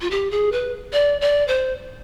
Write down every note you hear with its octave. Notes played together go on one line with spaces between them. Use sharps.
F4
G4
G#4
B4
D5
D5
C5